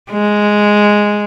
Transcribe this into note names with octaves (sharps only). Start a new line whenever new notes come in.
G#3